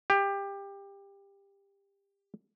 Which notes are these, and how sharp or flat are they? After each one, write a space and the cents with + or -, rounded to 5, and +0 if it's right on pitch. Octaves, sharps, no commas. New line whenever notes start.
G4 +20